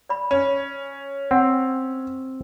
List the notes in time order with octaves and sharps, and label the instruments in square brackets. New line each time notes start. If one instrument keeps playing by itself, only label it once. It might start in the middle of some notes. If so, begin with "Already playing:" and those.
[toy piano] D5 B5
[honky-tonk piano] C#4
[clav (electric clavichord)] C4 [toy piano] F#5